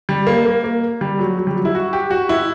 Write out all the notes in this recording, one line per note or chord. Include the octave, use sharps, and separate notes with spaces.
G3
A#3
A#3
A#3
G3
F#3
F#3
G3
F#3
E4
F#4
G4
F#4
E4